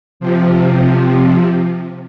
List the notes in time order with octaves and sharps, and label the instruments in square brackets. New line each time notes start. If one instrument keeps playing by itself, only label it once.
[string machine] C3 F3